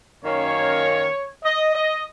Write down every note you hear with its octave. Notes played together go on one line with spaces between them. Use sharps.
F#2 D#3 A#3 C#4 C#5
D#5
D#5